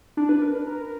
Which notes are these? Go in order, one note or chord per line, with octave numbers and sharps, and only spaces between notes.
D4
B4
A#4
B4
A#4